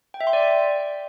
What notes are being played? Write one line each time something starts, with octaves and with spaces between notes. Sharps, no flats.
G5
E5
C6
D5
G5